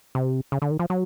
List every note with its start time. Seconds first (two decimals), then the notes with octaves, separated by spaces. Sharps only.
0.15 C3
0.52 C#3
0.62 D3
0.71 D#3
0.79 F3
0.90 F#3